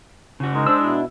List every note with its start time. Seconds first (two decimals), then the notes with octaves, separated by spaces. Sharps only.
0.40 C#3 F#4
0.54 G#3 D#4 A#4
0.66 D4 C5 E6
0.80 B2 E4